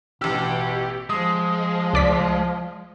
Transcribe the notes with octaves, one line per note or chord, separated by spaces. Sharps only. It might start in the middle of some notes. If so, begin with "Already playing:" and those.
A1 B2 G4 E6
F3 G#3 D#6
C#2 D5 B6